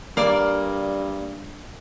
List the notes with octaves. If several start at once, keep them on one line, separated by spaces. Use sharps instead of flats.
G2 A#3 D5